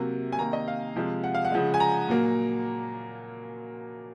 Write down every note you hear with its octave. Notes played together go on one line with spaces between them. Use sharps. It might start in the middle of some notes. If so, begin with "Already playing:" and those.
Already playing: C3 F#3 A#3
G#5
C3 D#3 A#3 A#5
D#5
F5
C3 F3 G#3
F#5
F5
F#5
C#3 F3 G#3
G#5
A#5
A#2 F#3 A#3